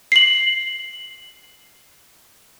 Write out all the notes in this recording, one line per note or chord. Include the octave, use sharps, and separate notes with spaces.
C7 F#7